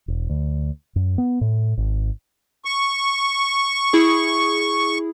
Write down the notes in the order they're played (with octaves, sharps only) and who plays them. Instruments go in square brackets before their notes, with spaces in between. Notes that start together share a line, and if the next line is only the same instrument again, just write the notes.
[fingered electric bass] E1
D2
F#2
B3
A2
G#1
[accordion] C#6
[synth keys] E4 G#4